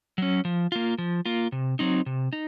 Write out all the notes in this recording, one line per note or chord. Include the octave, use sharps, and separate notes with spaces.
F#3 C#4
F3
A#3 F4
F3
A#3 F4
C3
F#3 C4 D#4
C3
D#4